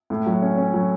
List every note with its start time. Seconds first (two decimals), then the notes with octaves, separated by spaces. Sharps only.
0.10 A2
0.26 F#3
0.42 C#4
0.58 C#4
0.74 F#3